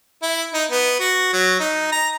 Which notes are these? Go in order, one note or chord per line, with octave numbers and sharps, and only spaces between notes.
E4
D#4
B3
F#4
F#3
D#4
A#5